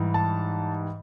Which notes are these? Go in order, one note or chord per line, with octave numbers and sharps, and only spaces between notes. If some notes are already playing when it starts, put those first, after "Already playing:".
Already playing: G#2 E3 G3
A5